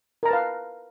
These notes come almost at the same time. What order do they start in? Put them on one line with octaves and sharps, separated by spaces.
A#4 A#5 A5 B4 F5